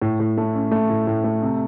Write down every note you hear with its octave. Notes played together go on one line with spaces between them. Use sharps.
A2
A2
A3
C#4
A3
A2
A2
A3
C3